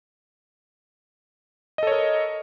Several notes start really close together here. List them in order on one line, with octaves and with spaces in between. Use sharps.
D#5 A4 C#5 A#4